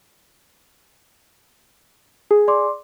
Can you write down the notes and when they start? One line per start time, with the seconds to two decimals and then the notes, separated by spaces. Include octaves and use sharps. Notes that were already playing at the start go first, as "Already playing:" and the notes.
2.31 G#4
2.48 D5 C6 D6